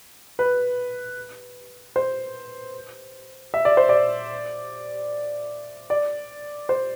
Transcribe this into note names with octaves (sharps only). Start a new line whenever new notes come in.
B4
C5
E5
D5
C5
D5
D5
C5